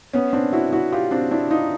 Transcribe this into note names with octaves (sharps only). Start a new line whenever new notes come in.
B3 C#4
C4 D4
E4 F#4
E4 F#4
F4 G4
C4 D4
D4 E4
D#4 F4